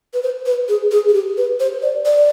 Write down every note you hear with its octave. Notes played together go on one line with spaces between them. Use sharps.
B4
C5
B4
G#4
G#4
G#4
G4
B4
C5
D5
D5